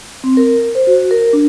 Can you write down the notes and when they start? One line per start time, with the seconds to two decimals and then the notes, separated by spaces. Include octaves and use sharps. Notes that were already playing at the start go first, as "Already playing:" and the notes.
0.24 C4
0.37 A#4
0.75 C5
0.87 F#4
1.11 A#4
1.33 D4